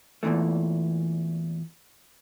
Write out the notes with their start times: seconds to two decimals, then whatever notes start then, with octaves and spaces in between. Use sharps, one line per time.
0.23 E2 A#2 C#3 E3 A3